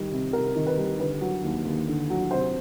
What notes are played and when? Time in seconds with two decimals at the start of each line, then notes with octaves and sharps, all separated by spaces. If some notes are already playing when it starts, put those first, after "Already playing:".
Already playing: D#3 G3
0.11 C3
0.33 C3 A#4
0.55 D#3
0.67 B4
0.77 G3
0.99 D3 B4
1.21 F#3
1.43 D#2
1.65 D#2
1.87 D3
2.10 F#3
2.31 C3 C5